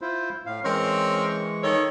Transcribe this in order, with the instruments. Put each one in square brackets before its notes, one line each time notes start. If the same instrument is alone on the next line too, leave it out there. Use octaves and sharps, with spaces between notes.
[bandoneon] E4 F4 C5
A2 F5
[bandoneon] E3 G#3 C#6 [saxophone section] C4 C#4 A#4
[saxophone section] D#3 A4 C#5